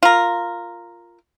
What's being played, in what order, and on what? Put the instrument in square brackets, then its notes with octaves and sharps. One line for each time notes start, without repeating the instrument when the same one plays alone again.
[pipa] F4 A#4